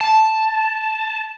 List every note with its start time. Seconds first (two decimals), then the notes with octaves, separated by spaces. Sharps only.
0.01 A5